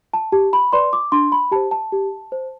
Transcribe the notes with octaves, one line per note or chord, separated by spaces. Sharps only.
A5
G4 A5
B5
B4 D5 C6
D6
D4 C6
B5
G4 C5 A5
A5
G4
C5